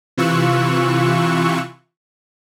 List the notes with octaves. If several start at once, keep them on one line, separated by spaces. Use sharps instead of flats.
C3 E3 F4 C#6 E6 F#6